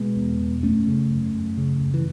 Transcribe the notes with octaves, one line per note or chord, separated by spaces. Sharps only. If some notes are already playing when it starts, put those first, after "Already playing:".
Already playing: B2 G#3 B3
E2
B2
F#2 A3 C#4
C#3
F#2
F#2
C#3
F#2
E3